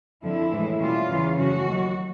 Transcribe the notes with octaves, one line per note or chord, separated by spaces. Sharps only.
F2 D3 F3 E4
A2 E3 G#3
B2 G3 A#3 C#4 E4 F4
E2 C#3 E3
F#2 C#3 F3 A3 C#4 F#4
D#2 D#3 F#3